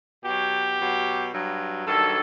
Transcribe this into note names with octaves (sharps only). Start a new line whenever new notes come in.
B2 F#3 G4
B2 F#3
G2 F#3
G2 D#3 F#3 A4